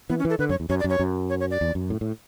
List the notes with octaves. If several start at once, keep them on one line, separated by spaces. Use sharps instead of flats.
E3 B3
C#4
E3 A4
D3 B4
F#2 C#5
E2
F#2 C#5
D5
F#2
C#5
F#2
C#5
C#5
D5
E2
F#2
A2
A2